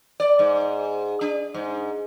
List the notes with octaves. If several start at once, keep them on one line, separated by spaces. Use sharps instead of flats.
D5
G#2
D4
G#2